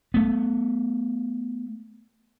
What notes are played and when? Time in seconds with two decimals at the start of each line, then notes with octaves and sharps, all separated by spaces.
0.14 A3 B3